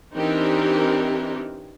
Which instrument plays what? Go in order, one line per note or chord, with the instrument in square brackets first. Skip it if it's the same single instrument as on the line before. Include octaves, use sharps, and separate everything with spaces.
[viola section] E3 C4 D4 D#4 G4 A#4